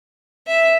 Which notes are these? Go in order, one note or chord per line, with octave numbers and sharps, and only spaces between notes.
E5